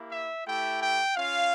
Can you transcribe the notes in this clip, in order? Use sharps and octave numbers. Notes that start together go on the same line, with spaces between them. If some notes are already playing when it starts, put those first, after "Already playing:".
Already playing: A#3 E4 G4
E5
A3 E4 G4 G5
G5
C#4 F4 F5